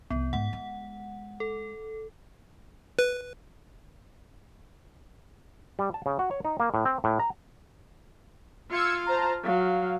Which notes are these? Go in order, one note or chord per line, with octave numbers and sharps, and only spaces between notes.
C2 F2 B3
G#2 F#5
G#3
A4
B4
G3
A5
C#3
F#4
C#5
D#4
A#3
A2
C4
A2
A#5
F4 F5 E6 G#6 C#7
C5 A5 A#5
F#3 F5